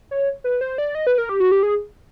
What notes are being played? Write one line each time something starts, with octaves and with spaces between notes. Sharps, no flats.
C#5
B4
C5
D5
D#5
B4
A#4
G4
F#4
G4
G#4